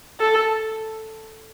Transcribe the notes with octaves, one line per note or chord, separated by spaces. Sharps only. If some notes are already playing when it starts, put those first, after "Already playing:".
A4